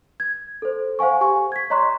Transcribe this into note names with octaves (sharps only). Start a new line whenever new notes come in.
G#6
A4 C5
C5 F5 F#5 G#5 C#6
G4 G#5 C#6
G#6 B6
C#5 D#5 A#5 C6 C#6 F#6